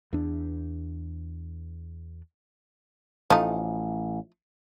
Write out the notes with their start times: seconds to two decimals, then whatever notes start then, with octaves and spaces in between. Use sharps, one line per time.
0.13 E2 D4
3.30 A1 F3 A3 D#4